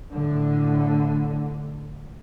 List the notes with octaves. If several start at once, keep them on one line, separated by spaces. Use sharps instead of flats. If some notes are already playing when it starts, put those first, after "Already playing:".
A2 D3